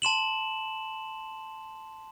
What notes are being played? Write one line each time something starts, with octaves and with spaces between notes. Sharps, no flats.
A5 C6 E7 F#7